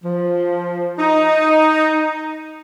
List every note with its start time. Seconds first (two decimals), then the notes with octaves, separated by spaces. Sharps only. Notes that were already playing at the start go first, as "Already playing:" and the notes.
0.04 F3
0.98 D#4